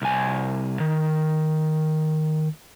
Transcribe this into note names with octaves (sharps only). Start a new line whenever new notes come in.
C2 G#5
D#3